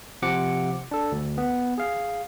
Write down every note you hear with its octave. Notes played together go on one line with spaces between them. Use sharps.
C3 F3 F#5 D6 C#7
D4 A4
D2
B3
G#4 F5